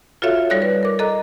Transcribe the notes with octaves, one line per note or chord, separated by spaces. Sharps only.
F4 F#4 A4 C#5 E5 F5
G3 D#4 A4 C#5 D5 F#6
B4
A#4 D6
A4 D#5 A#5 D6 F#6